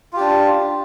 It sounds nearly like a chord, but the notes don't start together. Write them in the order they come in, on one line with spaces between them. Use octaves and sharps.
F4 G4 D4